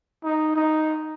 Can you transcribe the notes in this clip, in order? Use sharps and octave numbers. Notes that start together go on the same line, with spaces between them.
D#4
D#4